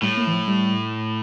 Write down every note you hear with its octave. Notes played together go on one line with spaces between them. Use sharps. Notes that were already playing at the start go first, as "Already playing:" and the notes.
A2 G3
A#3
E3
F3
G3